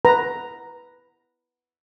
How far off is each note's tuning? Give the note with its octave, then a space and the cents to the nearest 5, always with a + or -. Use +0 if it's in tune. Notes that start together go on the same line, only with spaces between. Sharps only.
B4 +0 A#5 +0